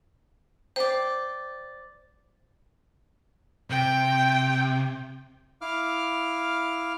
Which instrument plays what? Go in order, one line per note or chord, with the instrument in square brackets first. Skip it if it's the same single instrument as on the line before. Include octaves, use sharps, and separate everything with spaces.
[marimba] C5 [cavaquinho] D5 G5
[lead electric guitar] C3 [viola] G5
[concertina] E4 F5 D6 F6